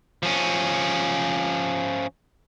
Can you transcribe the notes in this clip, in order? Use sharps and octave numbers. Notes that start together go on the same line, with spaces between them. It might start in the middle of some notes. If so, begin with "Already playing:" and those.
F3 C#4